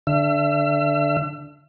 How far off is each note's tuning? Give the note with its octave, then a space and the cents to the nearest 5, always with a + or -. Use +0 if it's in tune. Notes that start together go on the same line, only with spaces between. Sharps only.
D3 +0 E5 +40